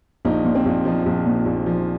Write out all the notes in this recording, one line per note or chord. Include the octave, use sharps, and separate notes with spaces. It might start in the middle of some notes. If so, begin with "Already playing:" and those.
A#1 D#4
A#2
C4
A#1
F3 D#4
A#1
A#2
A#1
F3